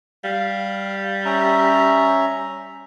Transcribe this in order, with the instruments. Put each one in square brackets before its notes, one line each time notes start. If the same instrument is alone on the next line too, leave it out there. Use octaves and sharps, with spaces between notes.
[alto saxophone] G3 [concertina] F5
[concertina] C#4 E5 A#5